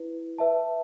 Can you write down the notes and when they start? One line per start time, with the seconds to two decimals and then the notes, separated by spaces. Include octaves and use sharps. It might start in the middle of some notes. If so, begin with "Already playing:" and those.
Already playing: E4 B4
0.38 B4 E5 A5